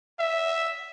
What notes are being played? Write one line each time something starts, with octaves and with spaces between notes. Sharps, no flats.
E5